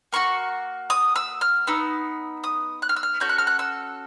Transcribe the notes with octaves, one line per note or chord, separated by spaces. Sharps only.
A#3 D4 F#4 C#6
D#6
E6
F6
B3 D#4 E6
D#6
F#6
F6
E6
F6
C#4 F#4 A4 G6
F#6
F6
F#6
E6